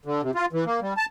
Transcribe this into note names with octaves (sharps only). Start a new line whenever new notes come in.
D3
C3
F4
E3
A#3
G3
A5